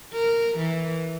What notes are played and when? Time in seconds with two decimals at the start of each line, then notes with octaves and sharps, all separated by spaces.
0.14 A#4
0.57 E3